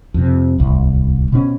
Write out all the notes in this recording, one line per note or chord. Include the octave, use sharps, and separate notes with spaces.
F2 C3
D1 C2
B2 C#4